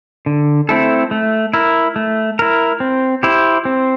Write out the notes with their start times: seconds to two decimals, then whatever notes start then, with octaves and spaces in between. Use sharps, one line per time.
0.26 D3
0.69 A3 C4 E4 A4
1.11 A3
1.54 E4 A#4
1.96 A3
2.39 E4 A#4
2.80 C4
3.23 E4 G4 C5
3.65 C4